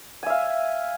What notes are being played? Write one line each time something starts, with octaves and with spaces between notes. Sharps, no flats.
E5 F5 G#5